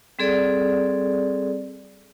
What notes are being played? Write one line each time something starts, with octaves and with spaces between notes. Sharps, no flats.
G3 C4 G#4 A4 D5